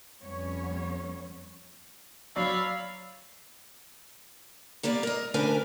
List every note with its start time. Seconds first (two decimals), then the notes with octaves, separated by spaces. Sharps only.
0.21 F2 G3 B3 C#4 C#5
2.36 F#3 C#5 D5 F5 B5 E6 A6
4.83 G3 A#3 B3 D5
5.03 A#4 D#5
5.34 D2 C#4 D4 A#4 B4 G#5